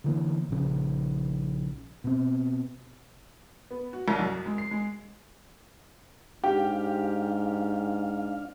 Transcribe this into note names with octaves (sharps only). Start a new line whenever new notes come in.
D3 E3 A#3
A#1 C#3
B2 C4
B3
F#4
C2
F#2
G#3
C7
G#3
G#2 D4 G4 F5